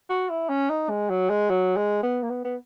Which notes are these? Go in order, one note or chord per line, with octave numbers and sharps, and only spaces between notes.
F#4
E4
C#4
D#4
G#3
F#3
G#3
F#3
G#3
B3
A#3
B3
B3